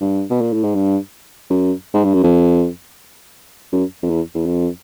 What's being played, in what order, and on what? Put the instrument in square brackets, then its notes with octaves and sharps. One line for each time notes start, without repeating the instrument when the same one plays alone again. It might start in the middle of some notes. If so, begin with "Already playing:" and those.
[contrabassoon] G2
B2
A#2
A2
G#2
G2
F#2
G#2
G2
F#2
F2
F#2
F2
E2
E2
F2